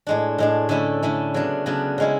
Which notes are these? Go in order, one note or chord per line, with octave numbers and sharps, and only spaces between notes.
A2 G#3 D4
A2 G#3 D4
D3 A3 C#4 E4
D3 A3 C#4 E4
C#3 F#3 B3 D4
C#3 F#3 B3 D4
C#3 G#3 C#4 E4